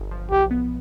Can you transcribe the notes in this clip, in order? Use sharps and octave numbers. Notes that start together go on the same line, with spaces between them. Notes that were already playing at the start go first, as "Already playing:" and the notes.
Already playing: G1
F3
B1 G4
B3